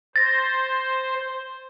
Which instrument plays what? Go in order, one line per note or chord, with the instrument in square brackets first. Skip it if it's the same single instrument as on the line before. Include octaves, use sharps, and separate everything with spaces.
[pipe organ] C5 [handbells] A6 A#6